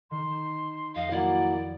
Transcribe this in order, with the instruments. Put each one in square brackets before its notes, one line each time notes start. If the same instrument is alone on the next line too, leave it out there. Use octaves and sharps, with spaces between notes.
[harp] D#3 [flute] C6
[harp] F2 [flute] D#5 [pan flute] F5
[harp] A#2 [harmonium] F#3 A#3 [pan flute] E4 [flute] D5